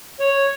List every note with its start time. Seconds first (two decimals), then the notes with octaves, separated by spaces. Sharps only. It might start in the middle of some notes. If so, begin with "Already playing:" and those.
0.20 C#5